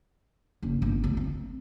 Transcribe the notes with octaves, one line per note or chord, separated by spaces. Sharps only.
F#1
G1
D2
C4